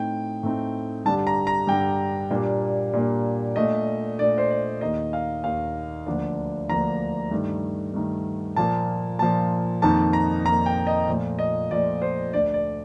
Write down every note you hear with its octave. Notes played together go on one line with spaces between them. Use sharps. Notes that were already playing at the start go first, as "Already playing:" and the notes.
Already playing: A2 A3 C4 D#4 G5
A2 A3 C4 D#4
G2 D3 G3 A5
A#5
A#5
G2 D3 G3 G5
A#2 G3 A#3 D4
A#2 G3 A#3 D4
A#2 A3 D4 D#5
A#2 A3 D4 D5
C5
D5
D#2 D#3 A#3 D#5
F5
D#2 D#3 A#3 F5
D2 D3 F3 A#3 D4
D2 D3 F3 A#3 D4 A#5
G2 D#3 A3
G2 D#3 A3
A#2 F3 A#3 A5
A#2 F3 A#3 A5
F2 D#3 A#3 D#4 A5
A#5
F2 D#3 A#3 D#4 A#5
G5
D#5
A#2 F3 A3
D#5
A#2 F3 A3 D5
C5
D2 D3 A3 D4 D5
D5